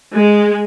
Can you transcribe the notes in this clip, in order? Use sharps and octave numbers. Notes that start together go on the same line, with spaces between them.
G#3